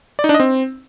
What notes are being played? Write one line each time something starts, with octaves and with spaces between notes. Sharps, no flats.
D5
D#4
D4
D#5
C4